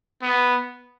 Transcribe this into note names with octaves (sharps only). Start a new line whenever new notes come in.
B3